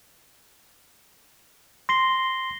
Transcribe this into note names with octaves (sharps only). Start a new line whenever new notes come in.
C6 A#6 C7 G7